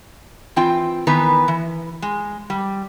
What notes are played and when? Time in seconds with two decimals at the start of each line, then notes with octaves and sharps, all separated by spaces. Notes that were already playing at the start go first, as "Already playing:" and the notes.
0.56 E3 C4 F4 G5
1.07 D#3 E3 B3 B4 A#5
1.48 E3
2.02 G#3
2.50 G3